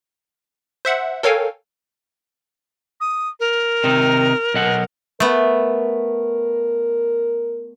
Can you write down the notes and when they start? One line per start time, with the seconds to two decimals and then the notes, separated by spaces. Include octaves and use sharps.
0.85 C5 E5 F#5
1.23 A4 A#4 C#5 F5 G5 G#5
3.01 D#6
3.40 A#4
3.84 C3 D#3 D#4
4.54 B1 D#5 F#5
5.20 A3 B3 A#4